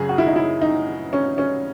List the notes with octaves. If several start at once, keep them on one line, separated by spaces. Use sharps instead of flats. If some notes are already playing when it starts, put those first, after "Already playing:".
Already playing: F#2 C#3 F#3 G#4
F#4
E4
D#4
E4
D#4
C#4
C#4